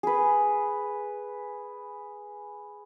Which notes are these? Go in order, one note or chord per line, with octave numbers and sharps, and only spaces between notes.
G#4 B4